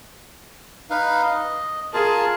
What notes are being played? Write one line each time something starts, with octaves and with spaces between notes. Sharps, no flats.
D#4 B4 F5
D#5
F4 G#4 A#4 A5